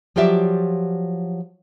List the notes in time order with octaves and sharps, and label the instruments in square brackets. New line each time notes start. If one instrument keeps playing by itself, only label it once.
[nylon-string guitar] F3 F#3 F4 G4 D5 E5